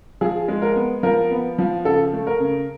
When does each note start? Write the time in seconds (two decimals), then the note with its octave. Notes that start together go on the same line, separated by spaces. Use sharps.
0.21 F3 G#4
0.48 G#3
0.62 A#4
0.76 B3
1.03 F3 A#4
1.31 B3
1.58 F3
1.85 C#3 A4
2.13 A3
2.27 A#4
2.40 C#3